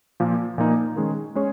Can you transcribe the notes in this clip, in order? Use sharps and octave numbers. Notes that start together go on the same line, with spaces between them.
A#2 F3 A#3
A#2 F3 A#3 D#4
D#3 G#3 C#4 G#4
G#3 C#4 G#4 C#5